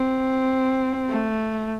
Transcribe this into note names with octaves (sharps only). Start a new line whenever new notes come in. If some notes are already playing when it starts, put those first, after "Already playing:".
Already playing: C4
A3